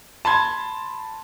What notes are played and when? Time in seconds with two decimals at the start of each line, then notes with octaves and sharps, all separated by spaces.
0.25 A5 B5 C6 G#6